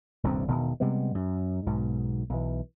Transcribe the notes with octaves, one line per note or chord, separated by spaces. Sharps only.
D#1 C2 G2 C4
E1 B2 D#3
C3 G3 G#3 B3
F#2
B1 G#2 B2
B1 E3